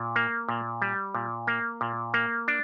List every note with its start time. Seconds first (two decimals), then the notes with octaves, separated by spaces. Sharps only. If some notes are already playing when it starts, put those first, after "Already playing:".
Already playing: A#2
0.16 A#3
0.49 A#2
0.82 G3
1.15 A#2
1.47 A#3
1.81 A#2
2.14 A#3
2.48 D4